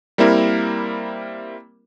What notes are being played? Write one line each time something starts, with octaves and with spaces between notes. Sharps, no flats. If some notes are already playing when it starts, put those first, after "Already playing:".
G3 A#3 C4 E4 A#4